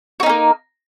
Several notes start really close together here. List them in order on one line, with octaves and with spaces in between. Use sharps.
F#4 D#4 C#4 A#3